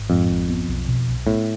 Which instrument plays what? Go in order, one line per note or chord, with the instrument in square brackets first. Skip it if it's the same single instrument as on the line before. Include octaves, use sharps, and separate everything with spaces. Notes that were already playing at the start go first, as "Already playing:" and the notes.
Already playing: [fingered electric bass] G#1
[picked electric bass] F2 [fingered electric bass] G#2
[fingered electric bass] G#1
B3
B1
B2
B1
[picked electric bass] A2 [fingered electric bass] B3